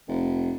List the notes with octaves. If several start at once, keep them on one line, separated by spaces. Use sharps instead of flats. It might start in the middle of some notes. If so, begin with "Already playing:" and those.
F1